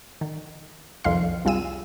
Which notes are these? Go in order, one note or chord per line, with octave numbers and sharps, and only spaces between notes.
D#3
C2 F2 D#3 F5 C6
C2 G3 F4 G#4 E6 D#7